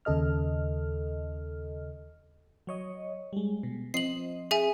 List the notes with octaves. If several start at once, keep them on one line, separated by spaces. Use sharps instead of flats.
D#2 C#3 A4 D#5 F6
F#3 C#5 D#5
G3 G#3
B2
F3 C4 D#5 C7 F#7
G#4 E5 G#5